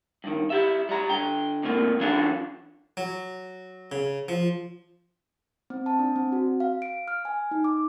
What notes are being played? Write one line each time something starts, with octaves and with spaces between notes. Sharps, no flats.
G2 D#3
E4 G4 E5
G3 A#5
D3 G5
C3 A3 A#3
E3 F#3 D4 F4 A4
F#3
C#3
F3
C4
A5
D4
C4
F#4
F5
D7
F6
G#5
D#4
D6